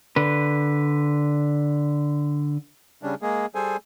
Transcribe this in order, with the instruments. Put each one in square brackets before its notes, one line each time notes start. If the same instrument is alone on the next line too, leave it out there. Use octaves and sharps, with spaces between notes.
[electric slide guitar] D3 B4
[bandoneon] C#3 G3 C#4 D4
G#3 A#3 G#4
G3 G#4 A4 C5 G#5